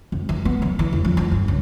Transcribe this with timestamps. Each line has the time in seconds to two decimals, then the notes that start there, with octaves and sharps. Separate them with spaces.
0.12 F2
0.29 E3
0.45 B3
0.62 F#2
0.79 E3
0.93 F2
1.05 F3
1.17 F2
1.32 G2
1.48 C#2